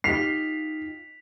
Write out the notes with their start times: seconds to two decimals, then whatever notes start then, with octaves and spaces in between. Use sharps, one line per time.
0.04 D#4 F4 G4 B6 C7 F7